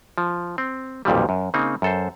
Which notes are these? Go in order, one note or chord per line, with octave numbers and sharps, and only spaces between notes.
F3
C4
B1 F2 A#2 D#3 G3
F#2
C#3 A#3 C4 D#4
F#2 A4 C5